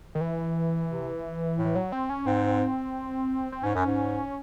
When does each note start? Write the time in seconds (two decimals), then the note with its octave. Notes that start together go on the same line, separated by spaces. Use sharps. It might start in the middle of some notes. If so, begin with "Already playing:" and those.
0.15 D#3
0.21 E3
0.90 C3
1.58 A2
1.65 E3
1.75 F#3
1.92 C4
2.10 C#4
2.26 G#2 C4
3.52 C4
3.63 G#2 C#4
3.75 F#2
3.86 G#2